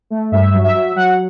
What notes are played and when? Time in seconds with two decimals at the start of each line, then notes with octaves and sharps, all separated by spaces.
0.10 A3
0.32 G2 E5
0.54 F#3
0.64 E5
0.74 F#3
0.96 F#3 F#5